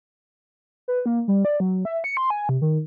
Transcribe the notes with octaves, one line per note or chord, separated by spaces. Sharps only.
B4
A#3
G3
D5
F#3
E5
C#7
C6
G#5
C3
D#3